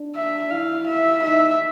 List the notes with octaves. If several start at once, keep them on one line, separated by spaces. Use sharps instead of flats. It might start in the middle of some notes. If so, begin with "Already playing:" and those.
Already playing: D4
E5
E4 F5
E5
D#4 E5